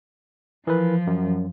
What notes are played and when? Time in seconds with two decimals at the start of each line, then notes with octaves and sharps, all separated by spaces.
0.67 E3 F3 A#4 B4
1.07 F#2